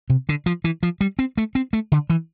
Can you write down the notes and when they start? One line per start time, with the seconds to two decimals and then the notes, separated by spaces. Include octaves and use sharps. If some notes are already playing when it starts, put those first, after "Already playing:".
0.10 C3
0.29 D3
0.46 F3
0.64 E3
0.83 F3
1.01 G3
1.19 C4
1.38 A3
1.55 C4
1.73 A3
1.92 D3
2.10 E3